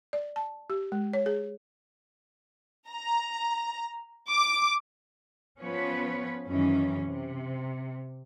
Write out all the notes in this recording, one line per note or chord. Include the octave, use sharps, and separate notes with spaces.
D5
A5
G4
G#3
C#5
G#4
A#5
D6
F3 B3 C#4 B4 C#5
F#2 D#3 E3 F#3 C#4
C3